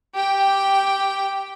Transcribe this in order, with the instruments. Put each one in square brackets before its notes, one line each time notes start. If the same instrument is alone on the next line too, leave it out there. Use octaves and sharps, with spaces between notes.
[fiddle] G4 G5